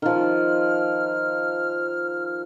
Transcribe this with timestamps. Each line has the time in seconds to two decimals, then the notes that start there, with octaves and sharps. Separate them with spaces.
0.02 D#3 F3 F6